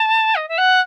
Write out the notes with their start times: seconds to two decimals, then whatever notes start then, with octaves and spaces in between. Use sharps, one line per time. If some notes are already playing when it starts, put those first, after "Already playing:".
Already playing: A5
0.35 D#5
0.48 E5
0.58 F#5